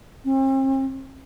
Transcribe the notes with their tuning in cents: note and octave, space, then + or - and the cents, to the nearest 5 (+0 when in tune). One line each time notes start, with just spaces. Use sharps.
C4 +45